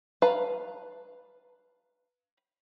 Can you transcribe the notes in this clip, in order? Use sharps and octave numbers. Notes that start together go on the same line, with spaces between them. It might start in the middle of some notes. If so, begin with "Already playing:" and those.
B4 F5 A5 A#5